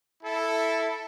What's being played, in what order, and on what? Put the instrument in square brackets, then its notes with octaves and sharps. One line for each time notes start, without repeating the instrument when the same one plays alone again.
[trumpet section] E4 A4